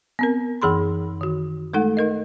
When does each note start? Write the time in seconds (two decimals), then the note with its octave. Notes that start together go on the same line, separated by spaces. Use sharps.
0.19 B3 C4 A#4
0.62 F#2 E3 G#4 B5 C6
1.21 D#3 F#4
1.74 G#3 A3 D#4 A4 F#5
1.97 D#4 A#4 D#5